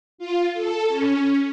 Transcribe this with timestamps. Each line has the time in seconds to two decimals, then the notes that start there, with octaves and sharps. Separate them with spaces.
0.18 F4
0.54 A4
0.89 C#4